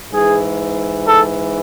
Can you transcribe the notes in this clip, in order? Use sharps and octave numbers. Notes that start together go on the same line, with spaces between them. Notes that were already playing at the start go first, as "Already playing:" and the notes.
G#2 E3 G#4
A4